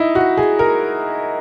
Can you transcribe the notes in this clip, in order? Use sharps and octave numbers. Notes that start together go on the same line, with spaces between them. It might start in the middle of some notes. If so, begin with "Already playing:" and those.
Already playing: D#4 E4
F#4
G#4
A#4